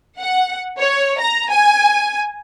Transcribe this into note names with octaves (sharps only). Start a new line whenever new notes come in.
F#5
C#5
A#5
G#5